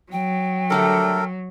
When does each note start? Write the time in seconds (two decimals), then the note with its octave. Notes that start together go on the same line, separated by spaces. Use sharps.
0.12 F#3 G5
0.70 D3 G3 A3 A4 A#4